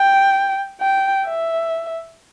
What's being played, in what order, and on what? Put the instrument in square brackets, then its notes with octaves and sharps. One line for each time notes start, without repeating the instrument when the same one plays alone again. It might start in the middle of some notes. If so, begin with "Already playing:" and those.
Already playing: [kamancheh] G5
G5
E5